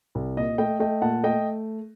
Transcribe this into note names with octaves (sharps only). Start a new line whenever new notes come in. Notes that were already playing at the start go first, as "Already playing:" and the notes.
C2
A#2 D#5
A3 D#5 G5
A3 D#5 G5
A#2 F#5 A5
A3 D#5 G5